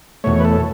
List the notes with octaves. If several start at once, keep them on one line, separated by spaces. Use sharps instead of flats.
E2 B2 A3 C#5
B4
A4